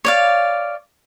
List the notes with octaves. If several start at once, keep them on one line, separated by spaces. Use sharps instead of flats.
C#5 D5 F5